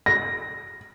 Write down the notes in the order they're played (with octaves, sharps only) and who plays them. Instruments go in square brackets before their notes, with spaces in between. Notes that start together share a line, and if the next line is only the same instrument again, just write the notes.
[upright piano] A#6